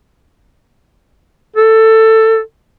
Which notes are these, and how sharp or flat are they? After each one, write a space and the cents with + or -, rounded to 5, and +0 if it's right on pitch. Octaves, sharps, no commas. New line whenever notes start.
A4 +15